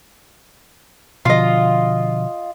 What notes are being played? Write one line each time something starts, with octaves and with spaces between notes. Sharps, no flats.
B2 D3 F3 F4 D#5